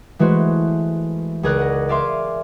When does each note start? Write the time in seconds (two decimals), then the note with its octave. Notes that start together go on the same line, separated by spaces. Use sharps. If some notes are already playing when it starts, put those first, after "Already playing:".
0.19 E3 G#3 A3 F#4 C5
1.43 C#2 D#4 G#4 A#4 D5 F#6
1.59 F#5 A#6
1.89 D5 E5 F5 G#5 C6 D6